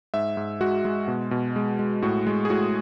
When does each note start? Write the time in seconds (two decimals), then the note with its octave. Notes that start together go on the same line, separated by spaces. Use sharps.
0.14 G#2 E5
0.37 G#2
0.61 G#3 F#4
0.85 G#3
1.08 B2
1.31 B2
1.56 G#3
1.79 G#3
2.03 A2 F#4
2.27 G#3
2.45 G#4
2.50 A2 F#4